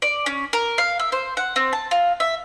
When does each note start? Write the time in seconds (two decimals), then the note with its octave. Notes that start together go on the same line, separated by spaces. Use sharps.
0.02 D5
0.26 C#4
0.53 A#4
0.78 F5
0.99 E5
1.12 C5
1.37 F#5
1.56 C4
1.73 A5
1.91 F4
2.20 E5